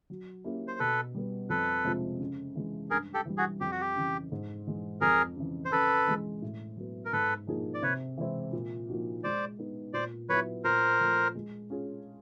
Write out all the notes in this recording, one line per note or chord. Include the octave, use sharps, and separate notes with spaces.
F#3
A#3 C#4 E4 G4
C5
B2 A4 B4
G3 B3
F2 A4 B4
C3 F3 G#3
C#3
E3 G#3
G2 G#4 A#4
G4 A4
E3 G3
F#4 G#4
F2 G4
F#4
G4
C#3 E3
G#2
E3 G#3
F2 G#4 A#4
C#3 E3
C5
C#3 A4 B4
E3 G#3
A2
F#3 B3
A#4
G#2 A4 B4
F3 A#3 D#4 G#4
D5
C3 B4 C#5
E3 G#3 C4 E4
A#2
F3 A#3 D#4 F#4
G#3 C5 D5
B3 D#4
A#2 C5 D5
F#3 B3 E4 B4 C#5
A#2 A#4 C5
F3 A3
G#3
C#4 F4 G#4